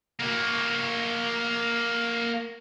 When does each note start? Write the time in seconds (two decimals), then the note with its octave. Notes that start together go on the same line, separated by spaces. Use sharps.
0.20 A#3 F#4